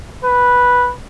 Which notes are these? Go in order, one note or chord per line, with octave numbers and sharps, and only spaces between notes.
B4